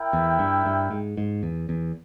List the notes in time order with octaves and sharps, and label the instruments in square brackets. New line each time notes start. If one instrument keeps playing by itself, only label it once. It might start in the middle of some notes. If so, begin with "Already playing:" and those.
Already playing: [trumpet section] E4 A#4 E5 G5
[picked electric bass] E2
G2
G2
G#2
G#2
E2
E2